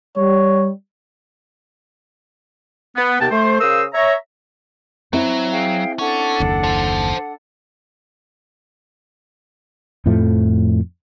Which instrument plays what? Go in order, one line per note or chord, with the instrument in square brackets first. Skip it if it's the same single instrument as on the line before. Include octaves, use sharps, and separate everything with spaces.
[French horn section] G3 [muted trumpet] C#5
[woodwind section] B3
D#2 C3 B3 G5 A5
A3 C5
C#3 A#4 C5 F5 D#6 E6
C#5 E5 A#5
[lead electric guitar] F#3 [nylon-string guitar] C4 E4
[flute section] G#4 F5 G5
[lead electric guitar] C#4 [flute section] D4 A4 F#5
[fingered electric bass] F#1 D#2
[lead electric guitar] C5 A5
[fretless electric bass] F2 A2 F3 A3